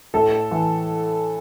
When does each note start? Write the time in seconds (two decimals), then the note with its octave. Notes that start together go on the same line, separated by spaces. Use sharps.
0.14 A2 A4
0.51 E3